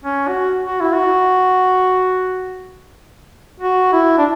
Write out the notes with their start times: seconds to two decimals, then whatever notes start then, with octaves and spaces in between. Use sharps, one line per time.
0.04 C#4
0.28 F#4
0.65 F#4
0.80 E4
0.93 F#4
3.60 F#4
3.92 E4
4.18 D4